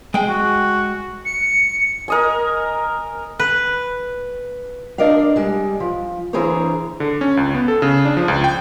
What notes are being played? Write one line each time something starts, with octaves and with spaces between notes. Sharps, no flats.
G#3 G5
F#4
C#7
A#4 D#5 G#5
B4
D4 A#4 D5 D#5 F5
G3 G#3
F3
D3 E3 G#4 A#4 C5 C#5
D3
C#4
C#2
B3
A4
C#3
D4
F3
C#2
G5